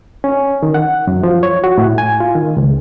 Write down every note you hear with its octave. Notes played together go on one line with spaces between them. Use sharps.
C#4
D#3
F#5
F#2
F3
C#5
F#4
A2
G#5
F4
D#3
C#2